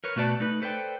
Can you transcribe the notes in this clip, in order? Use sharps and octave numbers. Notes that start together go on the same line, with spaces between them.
A#4 B4 C#5
B2 A3 F#4 B4 D5 A5
A3 D#4 B4
A4 B4 C5 D5 G5